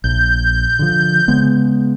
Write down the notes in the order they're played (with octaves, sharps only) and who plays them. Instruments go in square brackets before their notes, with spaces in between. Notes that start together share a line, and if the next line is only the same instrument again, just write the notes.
[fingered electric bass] A#1 [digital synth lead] G6
[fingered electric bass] D3 F3
C#3 G#3 B3